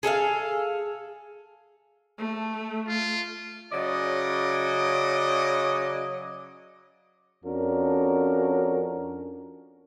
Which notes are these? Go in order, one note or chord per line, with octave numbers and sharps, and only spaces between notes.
G#4 A4 E5 F5
A3
F4
C#3 F#3 D5 D#5
F2 C#4 D4 F#4 A#4